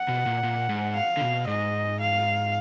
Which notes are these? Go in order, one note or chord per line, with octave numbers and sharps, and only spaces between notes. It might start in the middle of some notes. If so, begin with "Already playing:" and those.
Already playing: F#5
B2
A#2
A#2
G#2
F5
D3
B2
G#2 D#5
F5